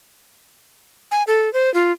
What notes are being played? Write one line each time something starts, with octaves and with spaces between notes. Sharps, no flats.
G#5
A4
C5
F4